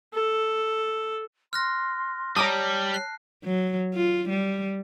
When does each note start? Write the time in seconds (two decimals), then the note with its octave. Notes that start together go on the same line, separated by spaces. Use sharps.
0.14 A4
1.53 C6 F6 F#6 A#6
2.37 G3 C#5 A5 A#5 D6 D#6
2.94 F#6 C7
3.44 F#3
3.95 F4
4.29 G3